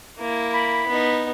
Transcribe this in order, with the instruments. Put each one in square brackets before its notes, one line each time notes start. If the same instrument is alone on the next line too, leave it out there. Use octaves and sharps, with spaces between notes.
[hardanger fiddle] A#3 E4
[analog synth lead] B5
[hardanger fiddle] B3 D#4